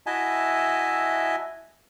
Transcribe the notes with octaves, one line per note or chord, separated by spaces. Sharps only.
E4 F#4 D#5 E5 G#5 A5